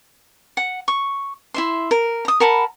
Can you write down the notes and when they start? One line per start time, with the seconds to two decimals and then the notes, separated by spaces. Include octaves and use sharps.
0.57 F#5
0.88 C#6
1.54 E4 E5 C6
1.91 A#4
2.25 A#5 D#6
2.40 A#4 F#5 A5 B5